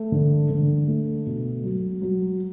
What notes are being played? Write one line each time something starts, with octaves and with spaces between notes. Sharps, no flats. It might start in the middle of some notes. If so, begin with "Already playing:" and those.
Already playing: A3
D3
D3
A3
B2
F#3
F#3